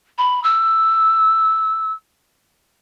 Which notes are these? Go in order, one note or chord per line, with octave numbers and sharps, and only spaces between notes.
B5
E6